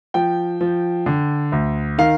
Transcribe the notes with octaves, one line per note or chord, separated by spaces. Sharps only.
F3 G5
F3
D3
D2
D#3 F5